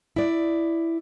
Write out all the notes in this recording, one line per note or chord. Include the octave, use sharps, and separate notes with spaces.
E4 D5